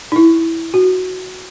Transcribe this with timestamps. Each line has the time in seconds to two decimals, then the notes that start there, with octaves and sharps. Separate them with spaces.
0.12 D#4
0.16 E4
0.74 F#4